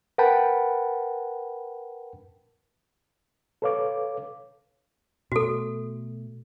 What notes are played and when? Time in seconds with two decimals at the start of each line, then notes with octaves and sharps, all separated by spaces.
0.18 A#4 B4 F#5 G5 A5 B5
3.62 A4 B4 C#5 F5 D6
5.32 B2 A3 F#4 A4